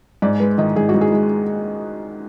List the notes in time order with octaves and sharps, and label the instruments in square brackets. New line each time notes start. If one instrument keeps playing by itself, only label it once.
[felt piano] G#2 D5
G#3 B4
D#3 D#5
G#2 G#4
F#4
G#2
G#4
G#3